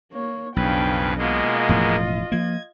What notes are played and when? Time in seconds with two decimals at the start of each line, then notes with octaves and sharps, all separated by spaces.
0.12 A#3 C#5
0.56 B1 F2 C#3 D4 B4 G5
1.18 B2 G#3 A#3 F4 D#5
1.69 E1 A2 F3
2.32 F3 A#3 G#6